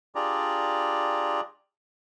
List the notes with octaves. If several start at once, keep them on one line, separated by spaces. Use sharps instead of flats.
D4 F4 G4 G#4 D5 A#5